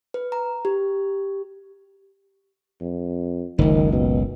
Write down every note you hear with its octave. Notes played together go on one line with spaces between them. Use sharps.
B4
A#5
G4
F2
F#1 C#2 D#3
B2